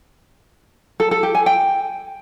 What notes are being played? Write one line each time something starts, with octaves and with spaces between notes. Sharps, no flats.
A4
A4
G4
G#5
G5